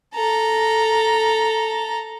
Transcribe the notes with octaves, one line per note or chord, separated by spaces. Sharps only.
A4 A#5